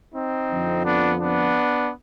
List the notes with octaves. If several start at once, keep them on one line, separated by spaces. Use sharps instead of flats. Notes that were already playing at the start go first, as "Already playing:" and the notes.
C4 D#4
F2 D3 F3
B3 D4
B3 D4